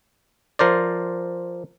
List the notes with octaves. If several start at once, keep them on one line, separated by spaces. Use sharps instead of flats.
F3 A#4 C5 D5